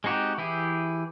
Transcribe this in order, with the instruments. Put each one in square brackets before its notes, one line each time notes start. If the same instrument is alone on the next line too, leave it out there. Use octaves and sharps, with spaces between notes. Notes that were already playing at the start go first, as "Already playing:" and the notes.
[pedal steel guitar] G#3 C4 D#4 F#4 G4
E3 E4 G4 G#4